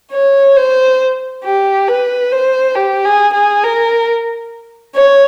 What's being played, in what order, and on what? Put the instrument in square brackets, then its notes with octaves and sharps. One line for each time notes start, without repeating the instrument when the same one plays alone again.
[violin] C#5
C5
G4
B4
C5
G4
G#4
G#4
A#4
C#5